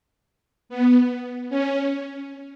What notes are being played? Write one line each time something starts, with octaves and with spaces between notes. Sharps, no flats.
B3
C#4